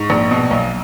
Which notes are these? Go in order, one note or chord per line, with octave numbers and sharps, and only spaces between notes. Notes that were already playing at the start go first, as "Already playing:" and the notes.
Already playing: G#2 C#6
A#1
B2
B1